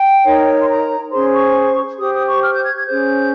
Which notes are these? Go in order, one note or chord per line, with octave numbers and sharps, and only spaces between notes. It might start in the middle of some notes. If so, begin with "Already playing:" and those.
Already playing: G5
D#4 A#4 C#5
C6
A#5
C#4 G#4 C5 C6
C#6
G4 C5 D#6
D#6
C#6
F6
G6
G#6
G#6
C#4 G#4 C5 G6